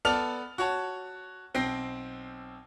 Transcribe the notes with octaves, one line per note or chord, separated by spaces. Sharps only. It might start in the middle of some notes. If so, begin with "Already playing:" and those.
B3 A4 D5 A5 F6 F7
F#4 C#5 A5
B1 C4 G5 A#6 C7